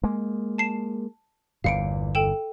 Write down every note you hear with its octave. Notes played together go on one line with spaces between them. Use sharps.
G#3 A#3
A5 C7 E7
G1 E2 A#2 F5 C#7 D7
A4 G5 E7